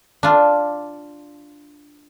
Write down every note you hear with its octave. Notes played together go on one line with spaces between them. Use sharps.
D4 F4